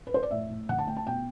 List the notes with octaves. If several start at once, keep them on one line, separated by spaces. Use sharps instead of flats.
B4
C5
D5
A2 E5
A2
D3 F#5
A5
A3 G5
A5
B2 G5